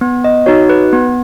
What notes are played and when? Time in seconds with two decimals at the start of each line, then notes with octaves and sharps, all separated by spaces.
0.01 B3
0.24 D#5
0.46 D#4 F#4 C#5
0.69 B4
0.93 B3